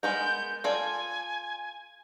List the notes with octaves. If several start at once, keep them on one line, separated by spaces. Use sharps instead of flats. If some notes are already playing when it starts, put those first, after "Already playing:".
G#3 B3 A#4 G6
F4 A4 D5 G#5